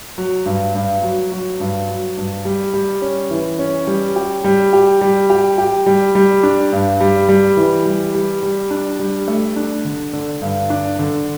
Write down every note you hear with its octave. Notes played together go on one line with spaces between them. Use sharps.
F#3
G2
G2
F#3
F#3
G2
F#3
G2
G3
G3
C#4
E3
C#4
G3
G4
G3
G4
G3
G4
G4
G3
G3
D4
G2
G3
G3
E3
G3
G3
G3
D4
G3
A3
D4
D3
D3
G2
D4
D3